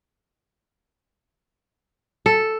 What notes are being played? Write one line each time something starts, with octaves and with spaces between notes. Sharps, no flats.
A4